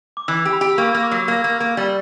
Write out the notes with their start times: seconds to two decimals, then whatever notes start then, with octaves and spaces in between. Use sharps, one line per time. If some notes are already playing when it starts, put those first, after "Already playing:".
0.17 D6
0.28 E3 E6
0.45 G4
0.53 B5
0.61 G4
0.78 A#3 C#6
0.95 A#3
1.03 D6
1.11 F#3
1.28 A#3
1.44 A#3
1.60 A#3
1.77 G3